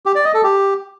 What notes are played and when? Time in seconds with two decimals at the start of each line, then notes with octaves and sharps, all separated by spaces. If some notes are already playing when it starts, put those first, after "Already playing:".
0.06 G4
0.15 D5
0.25 D#5
0.34 A4
0.44 G4